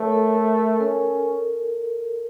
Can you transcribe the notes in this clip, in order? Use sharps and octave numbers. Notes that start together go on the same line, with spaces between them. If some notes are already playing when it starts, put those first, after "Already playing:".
Already playing: A3 A#4 C#5
A4
A#4
A4
C#4 A#4